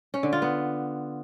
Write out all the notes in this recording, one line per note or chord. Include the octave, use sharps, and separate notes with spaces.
C#4
D3
F4
B3